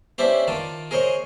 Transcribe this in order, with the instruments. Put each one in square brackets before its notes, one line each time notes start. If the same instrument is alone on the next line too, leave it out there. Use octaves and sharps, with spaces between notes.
[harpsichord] B3 C#4 D4 E4 G4 C5
D#3 F4 A5 D6
G#4 A#4 C5 C#5 D#5